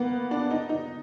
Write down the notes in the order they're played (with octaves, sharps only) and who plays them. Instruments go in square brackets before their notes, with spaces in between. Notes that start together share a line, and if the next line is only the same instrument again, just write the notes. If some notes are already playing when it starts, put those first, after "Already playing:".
Already playing: [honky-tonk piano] A#3 B3
D4
D#4
D#4